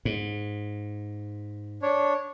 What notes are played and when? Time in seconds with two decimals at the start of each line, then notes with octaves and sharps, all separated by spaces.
0.05 G#2
1.82 D4 C#5